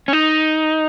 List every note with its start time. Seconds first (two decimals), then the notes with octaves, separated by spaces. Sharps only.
0.08 C#4
0.13 D#4